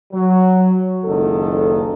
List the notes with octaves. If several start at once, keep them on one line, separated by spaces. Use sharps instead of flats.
F#3
F#1 C#2 D#3 A4